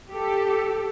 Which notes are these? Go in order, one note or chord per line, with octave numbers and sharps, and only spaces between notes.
G4 A4